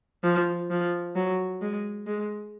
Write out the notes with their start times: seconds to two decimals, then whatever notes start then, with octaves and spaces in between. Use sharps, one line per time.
0.23 F3
0.70 F3
1.15 F#3
1.62 G#3
2.07 G#3